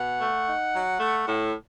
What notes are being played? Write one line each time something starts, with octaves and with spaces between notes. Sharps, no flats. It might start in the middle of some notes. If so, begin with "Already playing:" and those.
Already playing: B2 F#5
A3
D#4
F#3
A3
A2